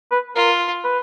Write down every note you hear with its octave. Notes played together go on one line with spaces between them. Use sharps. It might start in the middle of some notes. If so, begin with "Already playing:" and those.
B4
F4 A#4
B4